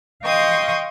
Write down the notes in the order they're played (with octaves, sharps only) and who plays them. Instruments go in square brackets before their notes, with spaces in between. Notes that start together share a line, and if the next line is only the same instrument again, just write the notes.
[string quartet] D#5 F5 G5 C6 C#6 D#6